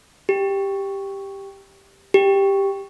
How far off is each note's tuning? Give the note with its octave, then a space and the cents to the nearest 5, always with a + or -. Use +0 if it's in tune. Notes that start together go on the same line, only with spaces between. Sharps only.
G4 +5
G4 +5